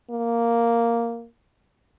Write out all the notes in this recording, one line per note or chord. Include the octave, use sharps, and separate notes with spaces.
A#3